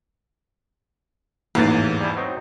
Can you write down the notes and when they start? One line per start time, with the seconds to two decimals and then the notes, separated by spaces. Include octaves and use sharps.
1.55 A1 E2 G#2 A#3 B4 F5 F#5 A6
2.00 G3 E4
2.16 F#3 C4 D#4